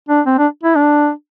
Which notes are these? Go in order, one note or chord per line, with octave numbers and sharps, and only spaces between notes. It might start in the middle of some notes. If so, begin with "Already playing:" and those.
D4
C4
D4
E4
D4